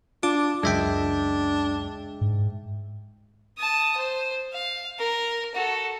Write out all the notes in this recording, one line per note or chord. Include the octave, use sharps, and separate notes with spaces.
D4 F4 D6
C#2 F#2 G#3 D4 E5 G5
G#2
A5 D#6
C5
F5
A#4
F#4 A4